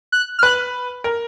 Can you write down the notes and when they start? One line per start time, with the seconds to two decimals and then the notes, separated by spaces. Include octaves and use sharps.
0.12 F#6
0.39 F6
0.43 B4 F#6
1.04 A#4